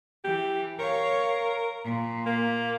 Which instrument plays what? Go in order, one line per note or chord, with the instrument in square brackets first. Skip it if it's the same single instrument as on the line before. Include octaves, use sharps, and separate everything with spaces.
[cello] E3 [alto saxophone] G4
[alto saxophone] A#4 [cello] C#5 F5
[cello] A#2
[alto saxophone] A#3